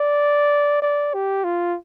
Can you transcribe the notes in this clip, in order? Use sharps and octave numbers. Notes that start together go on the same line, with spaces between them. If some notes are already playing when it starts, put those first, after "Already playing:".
Already playing: D5
D5
G4
F4